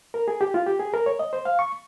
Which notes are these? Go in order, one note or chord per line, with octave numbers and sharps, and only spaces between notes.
A#4
G#4
G4
F4
G4
G#4
A#4
C#5
D#5
C5
F5
C#6